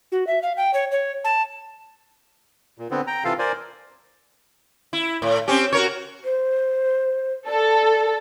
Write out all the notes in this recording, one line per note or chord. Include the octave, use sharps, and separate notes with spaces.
F#4
E5
F5
G5
C#5
C#5
A5
A#2
D3 B3 C4
G5 A#5
C3 E3 F4 A4 F5
A#4 C5 D5 G#5
E4
A2
C4 C#4 G4
F#4 A#4 C#5
C5
A4 D5